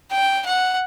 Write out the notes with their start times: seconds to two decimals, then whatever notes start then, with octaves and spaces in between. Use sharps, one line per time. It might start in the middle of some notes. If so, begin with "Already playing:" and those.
0.11 G5
0.46 F#5